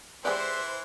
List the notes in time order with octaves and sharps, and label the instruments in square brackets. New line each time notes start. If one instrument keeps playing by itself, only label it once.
[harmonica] E3 E4 [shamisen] G#3 G4 D5 [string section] C5 [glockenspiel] F#6